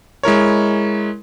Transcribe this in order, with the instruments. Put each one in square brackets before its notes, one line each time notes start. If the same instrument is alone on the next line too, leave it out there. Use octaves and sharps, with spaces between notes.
[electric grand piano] G#3 E4 A#4 C#5